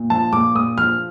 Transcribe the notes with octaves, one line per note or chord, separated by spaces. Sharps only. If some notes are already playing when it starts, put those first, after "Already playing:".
Already playing: A#2
F3 A5
A#2 D6
A#2 D#6
F3 F6